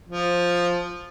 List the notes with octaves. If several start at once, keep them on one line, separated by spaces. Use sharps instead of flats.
F3